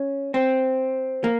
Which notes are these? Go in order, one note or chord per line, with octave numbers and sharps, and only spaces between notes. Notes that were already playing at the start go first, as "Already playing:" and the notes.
Already playing: C#4
C4
A#3